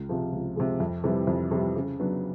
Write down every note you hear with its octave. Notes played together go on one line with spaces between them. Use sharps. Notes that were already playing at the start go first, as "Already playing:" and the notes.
Already playing: C#2
C3 F3 G#3
C#2
C3 F3 G#3
F2
C3 E3 G3
F2
C3 E3 G3
C#3
F#3 B3 D4